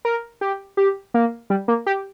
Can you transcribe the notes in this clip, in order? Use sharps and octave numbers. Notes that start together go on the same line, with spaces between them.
A#4
G4
G4
A#3
G3
A#3
G4